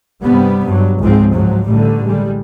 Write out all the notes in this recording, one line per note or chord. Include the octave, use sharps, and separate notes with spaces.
G2 C3 G3 B3
G2 F#3
C#2 G#2 F3 G#3 C4
G#2 F3 F#3
A1 A2 D3 G3 A3
D3 G3 G#3